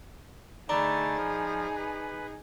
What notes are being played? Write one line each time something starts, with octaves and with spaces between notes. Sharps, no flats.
D3 A3 D4 D#4 G#4 A#5 B5 A6
F3
B4